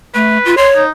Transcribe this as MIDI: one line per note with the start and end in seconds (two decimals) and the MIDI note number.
0.15 0.38 57
0.15 0.57 71
0.45 0.55 65
0.57 0.83 73
0.57 0.69 84
0.76 0.90 63